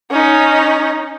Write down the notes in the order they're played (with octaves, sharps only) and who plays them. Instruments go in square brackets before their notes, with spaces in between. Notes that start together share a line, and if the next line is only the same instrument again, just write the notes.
[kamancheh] C#4 D#4